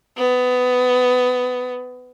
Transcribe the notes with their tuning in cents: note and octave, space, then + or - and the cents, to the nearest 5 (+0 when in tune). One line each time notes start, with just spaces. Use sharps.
B3 +20